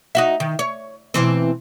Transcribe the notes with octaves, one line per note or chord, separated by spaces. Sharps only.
D#4 F#4 E5
D#3
C#5
B2 E3 C4